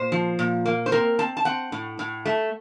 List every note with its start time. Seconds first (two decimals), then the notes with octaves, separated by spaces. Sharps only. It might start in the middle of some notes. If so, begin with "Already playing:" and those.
Already playing: A#2 C5
0.12 F3
0.39 A#2
0.65 A#3
0.86 C5
0.92 C4 A#4
1.19 C4 A5
1.37 A5
1.45 C4 F#5
1.72 A2
1.99 A2
2.25 A3